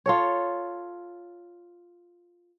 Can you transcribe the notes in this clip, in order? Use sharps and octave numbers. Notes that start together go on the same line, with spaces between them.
F4 A4 C#5